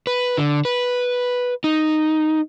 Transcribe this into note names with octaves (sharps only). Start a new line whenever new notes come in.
B4
D3
B4
D#4